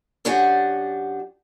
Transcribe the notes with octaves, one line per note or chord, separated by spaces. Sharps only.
F#2 D4 F#4 G4 F#5 G#5